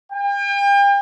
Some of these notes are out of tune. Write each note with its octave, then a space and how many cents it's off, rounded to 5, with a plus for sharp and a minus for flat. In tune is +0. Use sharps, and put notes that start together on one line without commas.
G5 +40